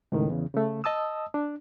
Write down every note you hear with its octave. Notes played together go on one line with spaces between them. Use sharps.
C#2 A2 D#3
E2 C#3
C#3 A3
D#5 A5 D#6 E6
D4